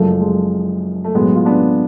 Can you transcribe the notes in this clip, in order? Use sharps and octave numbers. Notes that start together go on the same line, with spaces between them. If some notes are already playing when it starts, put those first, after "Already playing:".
Already playing: F#1 F#2 F3 G#3 A3
G#3
A3
B1 A2 F#3 G#3 B3
F4
B3 D4